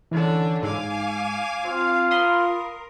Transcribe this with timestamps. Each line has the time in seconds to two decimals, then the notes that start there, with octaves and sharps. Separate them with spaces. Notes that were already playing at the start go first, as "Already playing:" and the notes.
0.11 D3 E3 C#4 D4
0.63 G#2 F5 G#5 D6
1.65 C4 F4
2.11 A#4 B5 C6 D#6